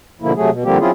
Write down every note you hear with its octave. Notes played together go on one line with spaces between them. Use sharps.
B2 D3 F3 A#3 E4
C3 F#3 A3 G#4
B2
D3 F3 G3 A#3 C4 G4
F#3 C4 C#4 E4 F4 G#4